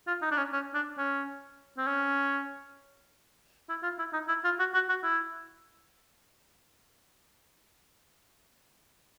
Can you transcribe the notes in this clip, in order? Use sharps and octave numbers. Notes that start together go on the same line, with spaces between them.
F4
D#4
D4
C#4
C#4
D4
C#4
C4
C#4
E4
F4
E4
D#4
E4
F4
F#4
F#4
F#4
E4